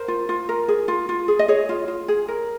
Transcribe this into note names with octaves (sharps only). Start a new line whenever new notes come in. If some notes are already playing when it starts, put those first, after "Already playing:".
Already playing: A#4 C5
F4
F4
A#4
G#4
F4
F4
G#4
D#5
G#4 C#5
F4
F4
G#4
A#4